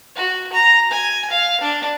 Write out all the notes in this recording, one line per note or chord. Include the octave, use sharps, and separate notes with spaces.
F#4
A#5
G#5
F5
D4